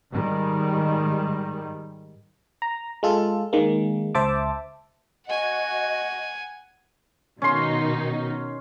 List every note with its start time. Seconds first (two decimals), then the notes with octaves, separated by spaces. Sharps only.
0.12 G#2 D#3 G3
2.62 A#5
3.03 G#3 F4 A4
3.53 D#3 G#3 A#3
4.15 C#2 C5 E5 A5 D6
5.27 F#4 D#5 F#5 G#5
7.42 B2 D#3 C#4 D#4 C6